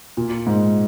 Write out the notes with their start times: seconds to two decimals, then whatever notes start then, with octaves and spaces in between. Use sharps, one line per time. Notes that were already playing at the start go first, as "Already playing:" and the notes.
0.17 A#2
0.47 G#2